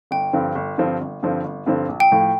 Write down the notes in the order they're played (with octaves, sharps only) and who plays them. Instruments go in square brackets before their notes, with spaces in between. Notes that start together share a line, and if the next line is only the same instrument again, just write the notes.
[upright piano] G1 [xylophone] G5
[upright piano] G2 D3 F3 C4
G1
G2 D3 F3 C4
G1
G2 D3 F3 C4
G1
G2 D3 F3 C4
A#1
[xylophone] G5
[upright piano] A2 F3